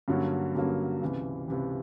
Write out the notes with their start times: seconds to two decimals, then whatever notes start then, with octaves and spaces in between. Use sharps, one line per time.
0.08 G2 D3 F#3 A#3 C#4
0.55 G2 D3 F#3 A#3 C#4
1.02 C#2 C3 E3
1.48 C#2 C3 E3